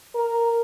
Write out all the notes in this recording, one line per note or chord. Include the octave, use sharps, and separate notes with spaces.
A#4